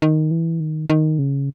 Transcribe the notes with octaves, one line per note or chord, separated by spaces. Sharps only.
D#3
E3
D#3
D#3
C#3